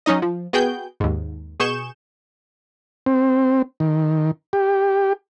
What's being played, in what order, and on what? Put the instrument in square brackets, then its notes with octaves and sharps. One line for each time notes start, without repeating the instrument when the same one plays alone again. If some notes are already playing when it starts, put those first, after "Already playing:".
[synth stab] F#3 C#4 D#4 D#5
F3
B3 F#4 G#4 G5 G6
D#2 G#2
B2 G#4 C#6 G6 E7
[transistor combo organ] C4
D#3
G4